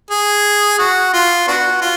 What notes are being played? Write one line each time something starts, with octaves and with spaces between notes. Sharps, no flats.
G#4
F#4
F4
B3 D4 F#4
F4